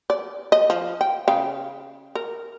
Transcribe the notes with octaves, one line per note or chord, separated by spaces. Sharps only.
D5
D#5
F3
G5
C#3 F5 G5
A#4